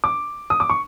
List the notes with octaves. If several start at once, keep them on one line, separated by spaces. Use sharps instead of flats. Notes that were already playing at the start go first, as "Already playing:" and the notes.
D6
D#6
D6
C#6